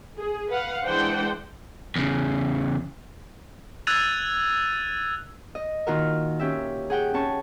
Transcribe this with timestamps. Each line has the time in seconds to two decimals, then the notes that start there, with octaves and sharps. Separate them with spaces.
0.18 G#4
0.51 B4 F5 F#5
0.86 E3 G#3 D4 C5 F#5 G5
1.96 E2 C#3
3.87 E6 F#6 G#6 A6 D#7 F7
5.55 D#5
5.87 A#2 D#3 F4 F#4 A#4
6.40 C#4 G4 E5
6.90 G#4 F#5 G5
7.14 C#4 A5 C#6